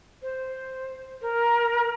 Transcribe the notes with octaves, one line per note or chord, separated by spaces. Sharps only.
C5
A#4